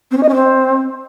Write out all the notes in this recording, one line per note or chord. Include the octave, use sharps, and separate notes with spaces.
C4
C#4
D#5
C#4
C4